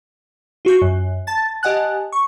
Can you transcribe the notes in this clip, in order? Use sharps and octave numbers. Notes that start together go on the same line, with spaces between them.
F4 F#4 C#6 G6
F#2
A5 A6
G4 D#5 F#5 G#5 A5 F#6
C#6